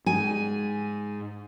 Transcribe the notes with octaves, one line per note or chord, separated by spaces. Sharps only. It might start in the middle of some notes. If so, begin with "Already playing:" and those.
G#2 G#5